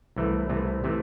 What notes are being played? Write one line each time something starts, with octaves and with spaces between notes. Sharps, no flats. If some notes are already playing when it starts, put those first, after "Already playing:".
C2 C3 E3 A3
C2 C3 E3 A3
C3 E3 A3